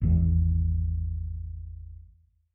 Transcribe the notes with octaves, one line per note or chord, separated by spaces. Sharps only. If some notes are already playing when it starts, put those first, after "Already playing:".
G#1 E2 E3